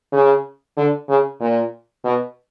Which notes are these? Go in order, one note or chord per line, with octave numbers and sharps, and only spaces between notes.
C#3
D3
C#3
A#2
B2